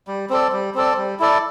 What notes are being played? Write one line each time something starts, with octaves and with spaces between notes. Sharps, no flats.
G3
C4 A4 D5
G3
C4 A4 D5
G3
E4 A4 D5